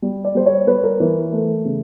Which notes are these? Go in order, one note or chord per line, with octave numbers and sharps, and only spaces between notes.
G3
D5
G3 C5
C#5
G3 B4
A#4
E3 A#4
A3
C#3